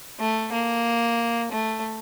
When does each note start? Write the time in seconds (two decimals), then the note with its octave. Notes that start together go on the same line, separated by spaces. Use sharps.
0.20 A3
0.53 A#3
1.52 A3